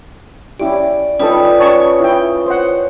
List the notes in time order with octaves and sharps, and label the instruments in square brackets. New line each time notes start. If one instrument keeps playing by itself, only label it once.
[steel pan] C#4 E4 G4 [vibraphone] D5
[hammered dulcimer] G3 [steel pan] C#4 D#4 A4 [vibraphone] F4 B4 D#6
[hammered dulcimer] C#3 [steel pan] C#5 A5 C#6
[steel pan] E4 G5
C5 F#5